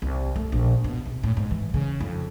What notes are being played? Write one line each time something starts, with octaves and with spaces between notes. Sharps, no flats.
C2
A3
A#1
B2
C3
A2
G#2
E3
C#3
F2